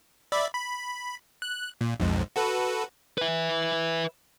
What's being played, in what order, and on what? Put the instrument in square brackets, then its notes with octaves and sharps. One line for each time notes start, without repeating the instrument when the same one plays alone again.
[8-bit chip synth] D5 E5 B5
B5
F#6
A#2
B1 F2 G#2
F#4 A4 B4
[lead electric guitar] B4 E5